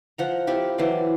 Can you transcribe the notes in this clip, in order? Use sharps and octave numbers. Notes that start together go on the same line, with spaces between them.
F3 F#5 A#5
C4 E4 F4 G4
E3 F#3 C5 D5